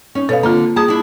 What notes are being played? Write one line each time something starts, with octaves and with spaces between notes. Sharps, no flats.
C#4 D#4
B2 A4 C#5 F5
D3 A#3 C4 F4
A#3 G#4 A5 D#6
D4 E4